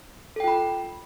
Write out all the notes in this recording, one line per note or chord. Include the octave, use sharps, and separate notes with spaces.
F4 A4 G5 B5